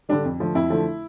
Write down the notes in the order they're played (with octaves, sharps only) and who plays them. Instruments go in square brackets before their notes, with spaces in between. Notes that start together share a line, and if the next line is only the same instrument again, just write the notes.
[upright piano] D3 G3 D4
F2
D3 F3 A3
F2 E4
D3 F3 A3